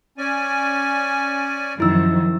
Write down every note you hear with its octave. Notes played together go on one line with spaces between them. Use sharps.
C#4 D5 G#5
F#2 D#3 F3 E4 E6